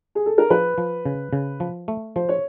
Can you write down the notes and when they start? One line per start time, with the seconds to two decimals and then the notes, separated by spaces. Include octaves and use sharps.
0.15 G#4
0.26 A4
0.38 A#4
0.50 F3 B4
0.78 F3
1.06 C#3
1.33 C#3
1.60 F3
1.88 A3
2.16 F3 C5
2.29 C#5